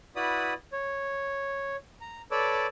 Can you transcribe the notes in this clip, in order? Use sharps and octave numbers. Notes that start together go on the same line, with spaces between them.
E4 F#4 B4 D5 B5 D#6
C#5
A#5
A4 B4 C#5 D5 D6 E6